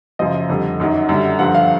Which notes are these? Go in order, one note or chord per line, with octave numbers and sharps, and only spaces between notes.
F#2 C#3 F3 D#5
F2 D3 G3
F#2 D#3 F#3
F#2 D3 G3
G2 D3 F3 F#5
F5